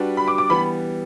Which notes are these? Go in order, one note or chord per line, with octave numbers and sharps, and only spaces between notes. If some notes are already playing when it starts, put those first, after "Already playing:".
Already playing: G3 D4 F#4 B4
B5
D6
D6
E3 G3 B3 B5